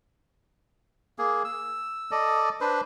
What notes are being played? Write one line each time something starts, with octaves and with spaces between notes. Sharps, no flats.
A#3 G#4
E6
A4 D5 D#5
D4 B4 C5